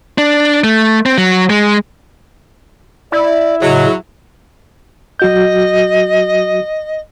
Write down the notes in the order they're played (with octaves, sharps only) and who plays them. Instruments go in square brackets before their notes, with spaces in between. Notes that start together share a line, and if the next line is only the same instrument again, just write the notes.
[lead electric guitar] D4
A3
C4
F#3
G#3
[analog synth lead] E4 [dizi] D5
[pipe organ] A2 C#3 [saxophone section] F#3 [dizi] D#5
[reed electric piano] F#3 F#4 G6 [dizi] D#5